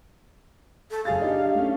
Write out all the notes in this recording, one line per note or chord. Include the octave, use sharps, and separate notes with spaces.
A4
F#1 G#4 F5 A6
D4 D#4 G4
A3 C#4